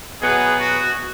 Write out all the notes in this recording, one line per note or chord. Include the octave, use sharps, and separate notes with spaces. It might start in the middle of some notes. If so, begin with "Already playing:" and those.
B2 F#3 B3 G#4
F#4